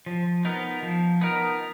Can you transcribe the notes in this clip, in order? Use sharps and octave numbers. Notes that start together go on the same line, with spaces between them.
F3
B3 D#4 A#4
F3
B3 D#4 A#4